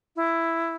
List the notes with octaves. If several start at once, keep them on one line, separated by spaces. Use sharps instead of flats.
E4